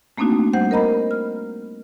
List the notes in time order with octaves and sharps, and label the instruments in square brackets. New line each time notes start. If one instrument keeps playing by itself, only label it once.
[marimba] A3 A#3 C4 D4 D#4 F#4
G3 C5 F#5 G6
A#4 C5 D#5 A#5 B5
F6